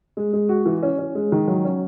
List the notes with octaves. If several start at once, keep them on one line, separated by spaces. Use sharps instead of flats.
G#3
G#3
F#4
E3
C#4
C#4
G#3
D#3
F#3
C#4